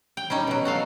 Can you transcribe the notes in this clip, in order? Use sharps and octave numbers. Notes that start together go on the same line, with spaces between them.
G5
G3 C#4 D#4
B2 F#3
F#4 A4 F5